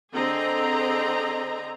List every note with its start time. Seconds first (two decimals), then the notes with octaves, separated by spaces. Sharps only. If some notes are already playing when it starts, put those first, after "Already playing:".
0.13 D3 C4 G#4 D#5 A#5